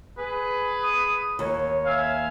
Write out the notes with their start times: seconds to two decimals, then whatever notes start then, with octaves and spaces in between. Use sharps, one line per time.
0.18 G#4 B4
0.83 D#6
1.39 D#2 C#5
1.86 E5 F5 G#5